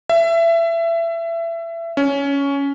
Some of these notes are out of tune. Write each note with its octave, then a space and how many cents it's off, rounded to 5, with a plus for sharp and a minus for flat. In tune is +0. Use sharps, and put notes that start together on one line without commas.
E5 +25
C#4 +10